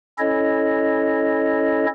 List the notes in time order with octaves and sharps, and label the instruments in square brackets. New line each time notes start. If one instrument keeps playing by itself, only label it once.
[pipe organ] C#4 E4 A4 C#5 D#5